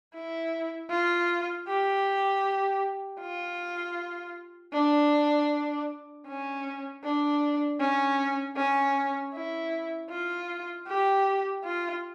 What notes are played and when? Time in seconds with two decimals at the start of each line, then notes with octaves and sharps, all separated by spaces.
0.15 E4
0.90 F4
1.68 G4
3.20 F4
4.73 D4
6.27 C#4
7.04 D4
7.80 C#4
8.57 C#4
9.34 E4
10.10 F4
10.88 G4
11.64 F4